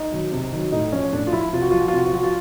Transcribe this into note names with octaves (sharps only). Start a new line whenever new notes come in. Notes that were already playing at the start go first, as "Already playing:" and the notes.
Already playing: D#4
D#3 F#3
C3
D#3 F#3
A2 D#4
F3 C#4
A2 D4
F4
F3 E4
C3 F4
F#4
F3 F4
F#4
F4
C3 F#4
F4
F3 F#4
F4